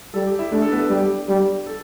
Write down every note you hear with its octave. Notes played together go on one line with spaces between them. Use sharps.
G3 A4
G4
E4 E5
A3 D4 D5
A4
B3 B4
A4
G3 G4
G3
A4